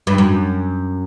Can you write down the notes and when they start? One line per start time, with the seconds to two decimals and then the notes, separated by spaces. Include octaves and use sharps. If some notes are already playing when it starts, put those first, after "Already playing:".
0.07 G2
0.18 F#2